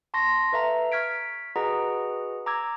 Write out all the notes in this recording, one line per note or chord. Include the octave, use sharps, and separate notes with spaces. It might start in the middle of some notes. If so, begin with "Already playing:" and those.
A5 C6 C#6 A#6
A4 B4 E5 F5 A#5
C#6 F6 G#6 B6 D7
F#4 G#4 B4 D#5 F#5 A#5
A#5 D6 E6 G#6